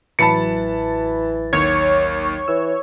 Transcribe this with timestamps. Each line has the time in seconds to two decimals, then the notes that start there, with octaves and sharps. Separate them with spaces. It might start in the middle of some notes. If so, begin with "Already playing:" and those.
0.19 A1 E3 F#3 A5 B5 A6 C#7
1.53 D#2 C#5
2.48 E3 E6